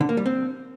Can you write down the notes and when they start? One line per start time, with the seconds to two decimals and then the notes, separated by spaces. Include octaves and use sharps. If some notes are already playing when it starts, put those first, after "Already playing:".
0.01 D3
0.09 A#3
0.17 G3
0.26 C4